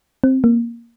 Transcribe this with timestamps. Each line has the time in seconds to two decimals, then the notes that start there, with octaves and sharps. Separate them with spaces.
0.24 C4
0.44 A#3